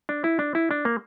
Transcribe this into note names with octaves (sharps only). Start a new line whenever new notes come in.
D4
E4
D4
E4
D4
A#3